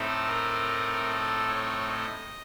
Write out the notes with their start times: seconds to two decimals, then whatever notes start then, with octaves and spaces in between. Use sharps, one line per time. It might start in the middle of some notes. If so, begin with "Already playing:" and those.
Already playing: A2 A3 C4 D#4 A4
0.27 A#4
1.08 A4
1.48 C#5
1.88 D#5